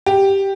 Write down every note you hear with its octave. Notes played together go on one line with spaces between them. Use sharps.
G4